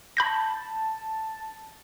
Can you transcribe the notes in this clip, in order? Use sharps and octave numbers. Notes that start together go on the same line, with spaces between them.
A5 B5 G6 A#6